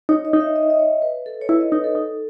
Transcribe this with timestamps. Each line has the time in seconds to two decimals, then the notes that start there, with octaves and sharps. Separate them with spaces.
0.09 D#4 C#5
0.25 D#5
0.33 D#4
0.41 E5
0.56 D#5
0.63 E5
0.70 D#5
0.79 C#5
1.02 B4
1.26 A4
1.41 C#5
1.49 E4 B4
1.61 D#5
1.72 D#4 B4
1.84 A4
1.95 D#4